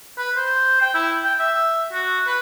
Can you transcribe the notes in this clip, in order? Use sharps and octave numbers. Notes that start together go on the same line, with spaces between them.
B4
C5
G5
E4
G5
E5
F#4
B4